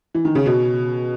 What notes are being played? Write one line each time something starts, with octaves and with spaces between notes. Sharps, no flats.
E3
D#3
C#3
B2